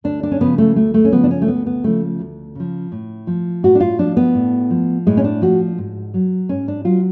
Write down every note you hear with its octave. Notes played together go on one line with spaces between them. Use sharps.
D2 D4
D4
C#4
C#3 F3 B3
A3
D2 A3
A3
C#4
C#3 F3 B3
D4
C#4
A3
D2 B3
B3
C#3 F3 A3
D2
C#3 F3
A2
F3
A2 F#4
D4
F4
F3 D4
B3
A2
F3
A2 G#3
C#4
D4
F3 F#4
G#2
F#3
G#2 C#4
D4
F#3 F4